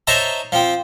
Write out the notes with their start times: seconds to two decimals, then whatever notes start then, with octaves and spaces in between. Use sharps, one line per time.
0.07 D#4 C5 C#5 E5 A5 A#5
0.52 F3 C4